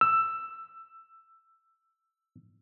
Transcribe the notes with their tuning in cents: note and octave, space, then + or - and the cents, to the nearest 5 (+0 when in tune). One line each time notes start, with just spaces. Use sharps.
E6 +10